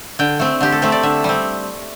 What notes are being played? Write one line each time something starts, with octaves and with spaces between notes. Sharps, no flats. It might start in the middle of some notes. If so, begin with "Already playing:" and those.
D3 G5
A3 C4
D3 G4
A4
A3 C4 C5
D5
D3 E5
G3 C4